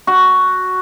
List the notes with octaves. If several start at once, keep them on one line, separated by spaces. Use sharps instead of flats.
F#4